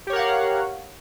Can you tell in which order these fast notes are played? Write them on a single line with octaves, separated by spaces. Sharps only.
G4 C#5 A#4 F#5 F5